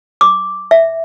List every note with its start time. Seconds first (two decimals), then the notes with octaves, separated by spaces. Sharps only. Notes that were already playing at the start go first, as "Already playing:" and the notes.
0.21 D6
0.71 E5